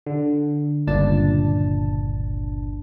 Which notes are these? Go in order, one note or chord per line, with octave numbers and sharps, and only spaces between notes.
D3
G1 C#2 A#2 D4 A5